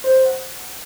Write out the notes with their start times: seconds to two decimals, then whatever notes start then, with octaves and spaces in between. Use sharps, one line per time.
0.04 C5
0.15 C5
0.25 F#5